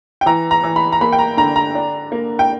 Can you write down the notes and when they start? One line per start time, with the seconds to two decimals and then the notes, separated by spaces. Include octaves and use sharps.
0.21 G5
0.26 E3 A#5
0.51 A#5
0.64 E3
0.76 B5
0.92 A#5
1.01 A#3 B5
1.13 G5
1.19 A#5
1.37 D3 A#5
1.56 A#5
1.75 D4
2.12 A#3
2.39 G5